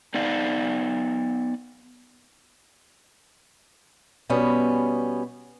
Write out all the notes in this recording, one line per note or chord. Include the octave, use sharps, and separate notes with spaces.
B3 D#4 D5 F5
B2 G3 B3 C#4